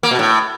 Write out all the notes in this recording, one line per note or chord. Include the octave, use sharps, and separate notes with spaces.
A#3
B2
A2